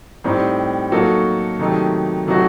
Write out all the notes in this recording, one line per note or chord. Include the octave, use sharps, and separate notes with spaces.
A2 G3 C4 D#4
F#3 A#3 D#4 F#4 A4
C3 D#3 F#3 A3 D#4
C3 F#3 A3 D#4 F#4